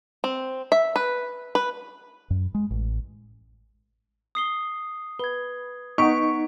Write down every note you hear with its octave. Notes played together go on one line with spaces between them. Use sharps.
C4
E5
B4
B4
F#2
G#3
A1
D#6 C7 G7
B4 G#6 G7
B3 D#4 F#5 A#5 C#6 B6 D7